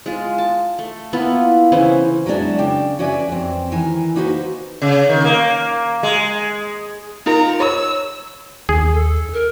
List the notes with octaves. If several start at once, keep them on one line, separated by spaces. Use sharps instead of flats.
G#3 F4
A5
A3
A#3 B3 E4 F4
C#3 E3 C#4 C5
F#3 G#3 B3 C4 D4 E4
C#3 D4 G5
C#4 F#4 B4 D5 E5 G#5
F2 C4
D#3 E3 A#4 G#5
A#3 D#4 F#4 G#4 B4 C5
C#3
D#3
A#3
G#3
D#4 F4 A#4 A#5
C#5 E6
D#2 G#4
A4
A#4